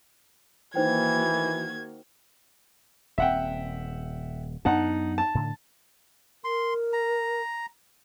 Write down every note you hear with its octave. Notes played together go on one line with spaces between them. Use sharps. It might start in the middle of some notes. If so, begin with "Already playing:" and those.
D#3 E3 A#3 D#4 F#4 C5 G5 G#6
D#1 C4 E5 F#5 G5
F#2 B3 D4 D#4 F#5 A5
A5
A2 D3
A#4 C6
A#5